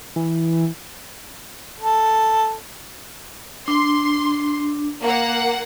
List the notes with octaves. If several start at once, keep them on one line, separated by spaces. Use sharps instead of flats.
E3
A4
D4 C6
A#3 F#5